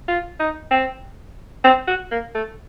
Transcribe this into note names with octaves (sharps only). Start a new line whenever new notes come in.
F4
D#4
C4
C4
F#4
A#3
A3